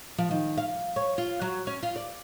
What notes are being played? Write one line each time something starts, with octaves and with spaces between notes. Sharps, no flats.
F3
D#3
F5
C#5
F4
F#3
C#4
F4
D5